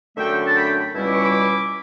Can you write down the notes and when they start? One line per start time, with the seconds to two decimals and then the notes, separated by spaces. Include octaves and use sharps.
0.17 F#2 D3 A3 D4 E5 G5
0.45 A5
0.56 G5 B5
0.94 C#2 B2 G3 C#4 E4
1.04 D6
1.13 C#6
1.23 B5 D6